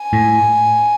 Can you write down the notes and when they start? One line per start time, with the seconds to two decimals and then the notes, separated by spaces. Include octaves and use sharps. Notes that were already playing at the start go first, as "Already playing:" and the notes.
Already playing: G#5
0.13 A2